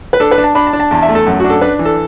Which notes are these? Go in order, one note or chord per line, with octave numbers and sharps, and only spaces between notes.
B4
D4 A4
B4
D4
A5
D4 B5
A5
D4
A5
E2 A5
E5
A3
A4
F#2
D4 F#4
A4
D4 B4
E3
A4